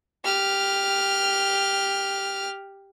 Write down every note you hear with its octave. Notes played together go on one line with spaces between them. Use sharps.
G4 F6